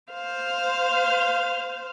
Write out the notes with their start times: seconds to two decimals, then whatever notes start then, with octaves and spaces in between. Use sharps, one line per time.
0.13 C5 F5